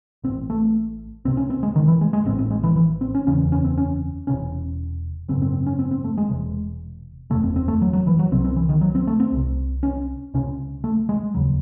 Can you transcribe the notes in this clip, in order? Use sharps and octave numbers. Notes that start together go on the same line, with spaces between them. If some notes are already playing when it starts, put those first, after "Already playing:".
A1 A2 C4
A3
C#2 C3 C4
C#4
C4
G#3
D#3
E3
G#3
G#3
A1 A2 C4
C4
G#3
E3
E3
C4
C#4
F#1 E2 C#3 C#4
C#4
C4
C#4
E1 E2 C3 C#4
G#1 F#2 C#3 C4
C4
C4
C#4
C4
C4
A3
G#3
E1 E2 C3
F#1 E2 C3 A3
C4
C4
A3
F#3
F#3
E3
F#3
C2 C3 C4
C4
E3
D#3
F#3
C4
A3
C4
C2 C3
C#4
C#2 C3 C#4
A3
G#3
E1 D#2 C#3 F#3